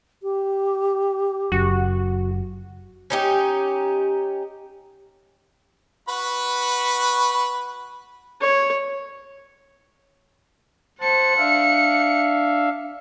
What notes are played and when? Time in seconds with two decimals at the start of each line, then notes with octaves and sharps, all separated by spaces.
0.23 G4
1.52 F#1 F#2 F#4
3.10 C#4 D#4 G4
6.09 F#4 B4 B5
8.41 C#5
11.01 C5 F#5 A5 C#7
11.38 D4 E5 F5